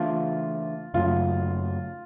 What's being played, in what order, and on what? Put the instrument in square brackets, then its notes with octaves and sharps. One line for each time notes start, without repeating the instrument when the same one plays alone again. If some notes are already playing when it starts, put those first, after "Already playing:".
Already playing: [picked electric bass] C#3 E3 A3 D4 [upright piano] F4
[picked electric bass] F#2 C#3 F#3 A3 [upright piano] F4